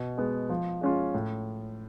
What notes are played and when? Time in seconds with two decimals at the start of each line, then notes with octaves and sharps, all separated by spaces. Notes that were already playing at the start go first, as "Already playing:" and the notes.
Already playing: B2
0.18 G#3 B3
0.49 F3
0.81 G#3 C#4 F4
1.14 A2